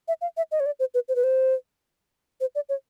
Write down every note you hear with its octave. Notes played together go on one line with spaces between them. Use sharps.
E5
F5
E5
D#5
C#5
D5
C5
B4
C5
B4
C5
C5
D5
C#5